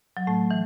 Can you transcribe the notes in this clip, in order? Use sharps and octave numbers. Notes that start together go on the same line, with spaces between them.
F#3
A2 A3
E3